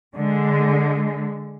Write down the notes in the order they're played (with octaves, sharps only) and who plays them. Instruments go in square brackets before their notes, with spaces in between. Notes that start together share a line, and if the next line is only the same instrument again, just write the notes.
[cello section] D3 G#3